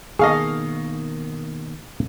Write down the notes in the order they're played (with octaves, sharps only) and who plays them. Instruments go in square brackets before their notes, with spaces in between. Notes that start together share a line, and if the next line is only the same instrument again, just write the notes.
[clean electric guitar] B2 D#3 A#3 [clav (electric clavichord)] G#4 A4 [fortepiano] D#5 F5 C#6